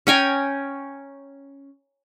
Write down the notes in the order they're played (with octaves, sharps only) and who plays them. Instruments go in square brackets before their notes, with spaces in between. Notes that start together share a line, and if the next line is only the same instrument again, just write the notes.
[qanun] C#4 G5 G#5 A#5